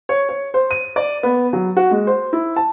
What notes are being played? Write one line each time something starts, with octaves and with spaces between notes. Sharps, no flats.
C#5
C#5
C5
D#7
D5
B3
F#3
F#4
G#3
C5
E4
A5